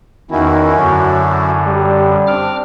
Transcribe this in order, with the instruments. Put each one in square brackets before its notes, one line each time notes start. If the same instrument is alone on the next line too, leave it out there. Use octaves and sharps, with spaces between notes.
[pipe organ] E2 [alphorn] D#3 [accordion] C#4 E4 F#4
[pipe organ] F#2 D3 [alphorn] F#3
[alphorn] G3
[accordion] C4 D4 [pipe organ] D6 F6